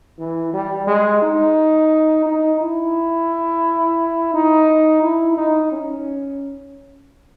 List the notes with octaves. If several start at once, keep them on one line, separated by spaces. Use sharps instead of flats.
E3
G3
G#3
D#4
D#4
E4
D#4
E4
D#4
C#4